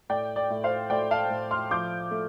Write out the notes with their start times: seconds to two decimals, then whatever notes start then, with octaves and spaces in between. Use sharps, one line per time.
0.09 A2 D5 G5
0.36 D5
0.50 A2
0.64 C5 F5
0.90 A2 D5 G5
1.11 F5 A5
1.30 A2
1.51 C6 F6
1.71 F3 D6 G6
2.11 A3